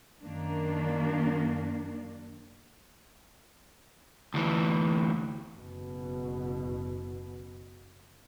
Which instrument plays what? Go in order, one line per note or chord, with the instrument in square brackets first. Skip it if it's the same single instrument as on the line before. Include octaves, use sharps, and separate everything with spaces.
[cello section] F#2 D#3 A#3 D4
[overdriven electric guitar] D2 E3
[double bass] F#1 B2